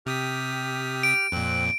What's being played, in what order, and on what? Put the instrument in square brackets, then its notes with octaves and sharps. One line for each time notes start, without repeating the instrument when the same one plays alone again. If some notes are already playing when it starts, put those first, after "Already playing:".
[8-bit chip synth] C3 D#6 B6 [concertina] G4 F6
[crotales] D7
[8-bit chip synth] F2 A#2 [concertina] C4 F#6